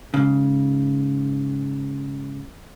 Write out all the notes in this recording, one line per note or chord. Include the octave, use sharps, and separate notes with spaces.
G#2 C#3